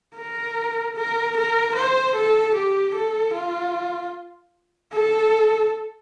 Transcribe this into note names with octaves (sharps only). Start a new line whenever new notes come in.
A#4
A#4
A#4
C5
A4
G4
A4
F4
A4